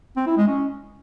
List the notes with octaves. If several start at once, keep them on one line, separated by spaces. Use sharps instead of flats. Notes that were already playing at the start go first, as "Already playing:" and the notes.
C4
E4
G#3
C#4